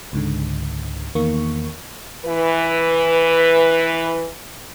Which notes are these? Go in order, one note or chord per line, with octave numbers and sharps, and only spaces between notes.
C#2 G#2 D3
E2 D#3 A#3 C#6
E3 B4